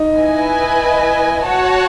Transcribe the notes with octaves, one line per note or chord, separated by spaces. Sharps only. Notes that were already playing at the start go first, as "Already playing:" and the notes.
Already playing: D#4
E4 B4 D#5 G#5
F#4 C#5 F#5 A5